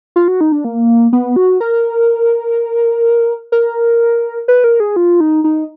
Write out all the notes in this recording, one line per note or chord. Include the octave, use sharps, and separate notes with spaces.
F4
F#4
D#4
D4
A#3
B3
F#4
A#4
A#4
B4
A#4
G#4
F4
D#4
D#4